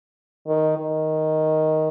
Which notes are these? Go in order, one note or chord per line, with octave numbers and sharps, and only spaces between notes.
D#3
D#3